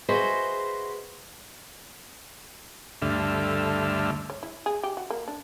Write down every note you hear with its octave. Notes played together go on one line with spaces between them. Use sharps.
F#4 G#4 B4 C5 D#5 E5
D2 G2 D3 A3 E5 F6
C#5
E4
G#4
G4
F#4
A#3
D4